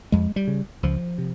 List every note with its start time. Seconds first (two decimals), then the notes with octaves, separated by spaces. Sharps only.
0.12 F2 G#3
0.36 G3
0.47 C#3
0.83 C#2 F3
1.18 C3